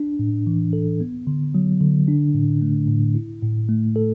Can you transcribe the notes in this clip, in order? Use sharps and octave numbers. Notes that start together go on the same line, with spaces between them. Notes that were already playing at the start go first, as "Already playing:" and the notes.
Already playing: D4
A2
E3
A4
B3
D3
F#3
D3
D4
A2
A3
A2
E4
A2
A3
A4